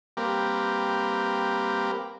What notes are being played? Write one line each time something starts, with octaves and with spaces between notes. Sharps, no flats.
G3 A#3 C4 G4 A#4 B4